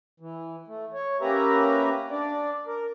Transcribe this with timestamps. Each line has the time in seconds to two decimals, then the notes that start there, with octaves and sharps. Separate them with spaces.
0.20 E3
0.67 A3
0.94 C#5
1.21 A#3 C#4 G4 B4 E5 A#5
2.11 D4 D5
2.67 A#4